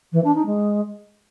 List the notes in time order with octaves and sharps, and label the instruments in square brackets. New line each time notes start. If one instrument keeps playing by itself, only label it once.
[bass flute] E3
D4
D#4
G#3